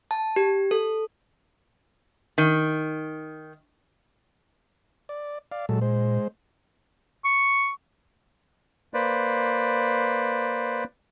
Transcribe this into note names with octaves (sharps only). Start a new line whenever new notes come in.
A5
G4
A4
D#3
D5
D5 F5
A#2 F#3 G#3 A4
G#3 C5
C#6
A#3 B4 C5 D5